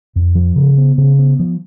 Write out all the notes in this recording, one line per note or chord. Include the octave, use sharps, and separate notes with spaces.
F2
F3
C#3
B3
C#3
B3
F3